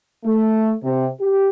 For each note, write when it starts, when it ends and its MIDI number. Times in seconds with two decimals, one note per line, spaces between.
0.23 0.71 57
0.83 1.07 48
1.20 1.49 67